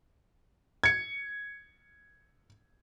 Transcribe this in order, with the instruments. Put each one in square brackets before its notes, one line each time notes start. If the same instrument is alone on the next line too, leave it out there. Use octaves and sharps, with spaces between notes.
[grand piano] G#6 C#7